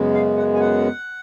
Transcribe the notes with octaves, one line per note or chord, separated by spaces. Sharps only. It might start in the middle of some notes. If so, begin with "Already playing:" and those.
Already playing: F#2 C#3 G#3 B3
F5
F#5
G#5
F#5